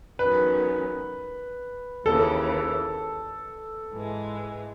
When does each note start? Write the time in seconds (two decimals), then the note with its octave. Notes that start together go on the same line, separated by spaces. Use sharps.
0.19 E2 D#3 F#3 C#4 B4
2.05 D#2 C#3 E3 A4
3.92 G#2 E3 G#3